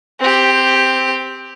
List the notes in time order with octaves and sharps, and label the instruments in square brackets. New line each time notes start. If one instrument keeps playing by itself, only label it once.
[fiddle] C4 G4